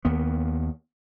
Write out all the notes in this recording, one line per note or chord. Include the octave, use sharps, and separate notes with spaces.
D#2 A#3 B3